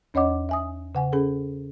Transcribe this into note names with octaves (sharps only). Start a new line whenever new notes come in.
E2 C#4 C#5 D#5 F#5 D6
E5 G#5 D#6
C#3 F#5 G#5
C#4 G#4 A4